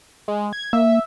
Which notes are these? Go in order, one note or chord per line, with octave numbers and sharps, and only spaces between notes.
G#3
G#6
A#3 E5